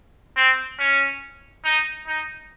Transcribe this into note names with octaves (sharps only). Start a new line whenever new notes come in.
C4
C#4
D#4
D#4